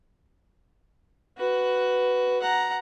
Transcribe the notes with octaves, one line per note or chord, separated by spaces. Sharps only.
F#4 B4
F#5 A#5